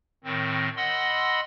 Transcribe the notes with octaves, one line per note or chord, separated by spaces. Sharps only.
A2 D#3 C4
D#5 F#5 B5 C6 E6